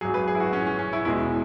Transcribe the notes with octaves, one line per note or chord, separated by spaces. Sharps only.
G#1 F#2 F#3 G#4
B4
G#4
E4
F#4
C#4
C#4
C#4
E4
E1 E2 B2 G#3 E4